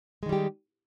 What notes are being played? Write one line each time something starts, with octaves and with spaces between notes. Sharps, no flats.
D#3 G3 G#3 G4